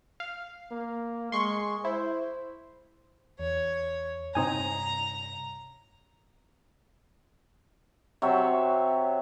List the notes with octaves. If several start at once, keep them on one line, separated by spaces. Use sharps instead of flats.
F5
A#3
G#3 C6 C#6
E4 C5
E2 C#5
G2 C3 C4 D#4 G#5 A#5
C3 F#3 C#5 E5